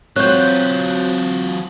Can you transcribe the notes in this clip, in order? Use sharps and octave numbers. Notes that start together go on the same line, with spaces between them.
F#3 C4 F4 F#4 C5 C#5 F#6 G6